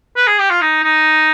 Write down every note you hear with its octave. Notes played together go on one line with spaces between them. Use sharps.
B4
G#4
G4
F4
D#4
D#4